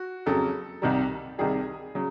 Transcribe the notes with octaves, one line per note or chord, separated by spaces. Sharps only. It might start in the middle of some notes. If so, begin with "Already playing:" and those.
Already playing: F#4
F2 C#3 F#3 A4
C2 C3 D#3 G3
C2 C3 D#3 G3 G#4
C#3 F#3